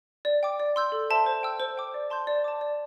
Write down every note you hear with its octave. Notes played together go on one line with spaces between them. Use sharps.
D5
G5 D6
D5
C6 E6 G6
A4
C5 E5 A5 C6
C5
G5 E6 G6
C5
G5 D6
D5
A5 C6 G6
D5
A5 D6
D5